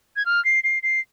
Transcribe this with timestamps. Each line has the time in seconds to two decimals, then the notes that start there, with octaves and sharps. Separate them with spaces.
0.16 G#6
0.26 F6
0.45 C7
0.64 C7
0.83 C7